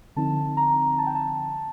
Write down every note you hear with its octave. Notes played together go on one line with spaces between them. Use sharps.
D3 F3 C4 D#4 A5
A#5
A5
G5
A5